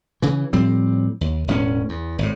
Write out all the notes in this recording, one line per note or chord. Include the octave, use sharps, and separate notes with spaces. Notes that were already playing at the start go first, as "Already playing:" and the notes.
C#3 E3
A2 F3 G3 C4
D#2
E1 A2 A#3 C#4
E2
G#1 A2